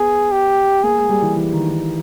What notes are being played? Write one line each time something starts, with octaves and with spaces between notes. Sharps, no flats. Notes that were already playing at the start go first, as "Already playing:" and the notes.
Already playing: B3 G#4
G4
A#3 G#4
G#3
G3
E3
E3
D#3
D#3